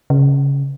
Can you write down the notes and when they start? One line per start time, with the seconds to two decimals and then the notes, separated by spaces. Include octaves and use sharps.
0.10 C#3